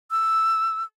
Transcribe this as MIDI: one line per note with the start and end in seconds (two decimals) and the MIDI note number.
0.11 0.83 88